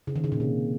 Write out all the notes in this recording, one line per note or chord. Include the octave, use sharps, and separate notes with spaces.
C#3
D#3
C#3
A#2
C3